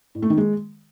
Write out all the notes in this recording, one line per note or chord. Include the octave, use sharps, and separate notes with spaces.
A2
A3
D#3
G#3